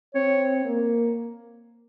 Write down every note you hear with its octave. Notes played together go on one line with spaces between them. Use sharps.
C4 C#5
A#3